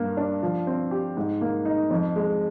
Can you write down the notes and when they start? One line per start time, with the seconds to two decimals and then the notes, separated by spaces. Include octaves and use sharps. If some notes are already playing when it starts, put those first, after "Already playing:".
Already playing: G2 A#3
0.17 D4
0.43 F3
0.67 C4
0.91 G4
1.17 G#2
1.41 A#3
1.65 D#4
1.90 F2
2.16 G#3